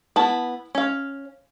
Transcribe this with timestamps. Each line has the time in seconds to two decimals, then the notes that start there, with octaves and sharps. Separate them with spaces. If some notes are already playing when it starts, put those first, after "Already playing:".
0.16 B3 E4 A5
0.75 C#4 F5